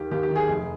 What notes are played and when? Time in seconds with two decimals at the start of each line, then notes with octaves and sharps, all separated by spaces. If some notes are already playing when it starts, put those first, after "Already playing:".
Already playing: D#2 D#3 G4
0.11 D#2 G4
0.23 G4
0.30 D#3
0.35 G#4
0.48 F1